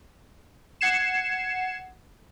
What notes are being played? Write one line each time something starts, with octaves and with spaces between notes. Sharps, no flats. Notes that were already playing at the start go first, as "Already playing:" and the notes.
F#5 G#6 C7 C#7 E7